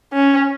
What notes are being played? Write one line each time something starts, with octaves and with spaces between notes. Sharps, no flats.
C#4